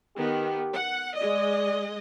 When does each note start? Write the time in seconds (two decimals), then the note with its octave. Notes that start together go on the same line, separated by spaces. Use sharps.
0.16 D#3 B3 G4
0.75 F#5
1.17 G#3 D5 D#5